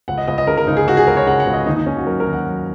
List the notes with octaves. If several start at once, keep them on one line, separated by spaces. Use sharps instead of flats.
C#2 F#5
D#5
C#2 D#5
D#5
C#3 A#4
A#4
C#2 D#4
G#4
C#2 F#4
G#4
C#2 A#4
C#5
C#3 F#5
F#5
C#2
D#5
D#2 D#4
D#4
D#2 C#4
F#4
F#3 A#4
A#4
D#2
F#5
F#3